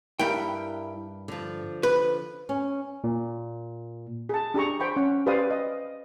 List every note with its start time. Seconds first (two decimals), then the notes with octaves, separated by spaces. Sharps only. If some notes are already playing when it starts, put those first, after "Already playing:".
0.19 G2 G3 E4 A#4 G5
1.28 D3 F3
1.83 B4
2.49 C#4
3.04 A#2
4.29 G#4 A5
4.54 D4 G4 G#4 A#5 C#6
4.80 C5 G5 B5 C#6
4.96 C#4 F#5
5.26 G4 B4 C5 D5 F5 D#6
5.51 D#5